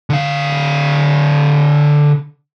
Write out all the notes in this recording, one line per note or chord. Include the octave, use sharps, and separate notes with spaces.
D3 F5